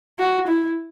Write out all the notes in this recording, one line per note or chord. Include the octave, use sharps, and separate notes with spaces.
F#4
E4